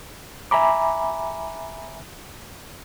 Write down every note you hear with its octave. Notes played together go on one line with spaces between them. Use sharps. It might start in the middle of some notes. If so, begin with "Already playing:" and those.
E5 G#5 A#5 B5 D6